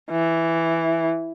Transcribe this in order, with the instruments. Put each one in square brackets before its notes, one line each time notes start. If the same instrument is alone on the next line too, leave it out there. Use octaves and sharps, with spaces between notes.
[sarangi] E3